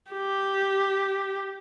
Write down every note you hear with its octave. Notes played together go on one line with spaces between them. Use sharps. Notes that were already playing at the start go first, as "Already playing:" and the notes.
G4